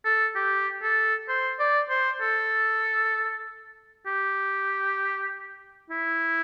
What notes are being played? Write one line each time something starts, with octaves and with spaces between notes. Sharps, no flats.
A4
G4
A4
C5
D5
C5
A4
G4
E4